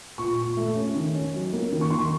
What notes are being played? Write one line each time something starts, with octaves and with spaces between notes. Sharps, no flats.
A#2 C#6
A#2
A3
C#4
D#3
C#4
F#3
A#3
D#3
C#6
D#3 C6
C#6